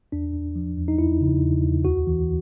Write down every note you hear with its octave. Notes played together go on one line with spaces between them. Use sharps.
E2 D4
E2
F3
E2
D#4
E2 E4
C#3
E2
E2
D2 F#4
E3